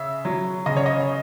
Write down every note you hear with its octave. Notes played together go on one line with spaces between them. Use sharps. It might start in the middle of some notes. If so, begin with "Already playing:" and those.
Already playing: C#3 E5
F#3
C#3 D#5
C#5
D#5